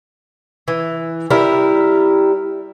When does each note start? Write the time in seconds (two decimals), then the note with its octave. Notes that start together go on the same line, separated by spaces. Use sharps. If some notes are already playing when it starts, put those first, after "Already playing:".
0.68 E3
1.30 G3 E4 A#4